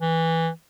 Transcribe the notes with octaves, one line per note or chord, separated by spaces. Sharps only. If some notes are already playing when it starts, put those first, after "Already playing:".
E3